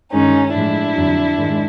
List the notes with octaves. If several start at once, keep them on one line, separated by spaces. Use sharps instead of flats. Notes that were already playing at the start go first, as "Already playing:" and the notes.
G2 D#3 G#3 C#4 D#4
A2 F3 G#3 D4 E4
F2 D3 F#3
G#2 D#3 G#3